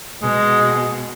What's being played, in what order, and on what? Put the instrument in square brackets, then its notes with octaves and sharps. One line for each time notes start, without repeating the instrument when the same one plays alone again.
[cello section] B2 [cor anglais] G#3